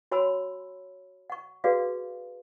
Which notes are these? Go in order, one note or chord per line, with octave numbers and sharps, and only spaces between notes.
F#4 C#5 G#5 B5 C6 E6
F#5 C#6
F#4 G#4 A4 B4 D5 F5